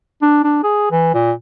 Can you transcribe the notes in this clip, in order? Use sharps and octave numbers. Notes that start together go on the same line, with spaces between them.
D4
D4
G#4
E3
A#2